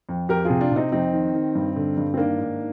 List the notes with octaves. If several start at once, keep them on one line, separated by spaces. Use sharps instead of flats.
F2
F2 G4 A#4
C3 F4 G#4
D4 F4
C3 C4 D#4
F2 C4 D#4
D#3
D#3
G2
D3
G2
C4
D#3 A#3 D4
G#2